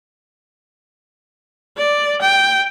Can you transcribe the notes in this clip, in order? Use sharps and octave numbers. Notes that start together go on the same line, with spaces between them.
D5
G5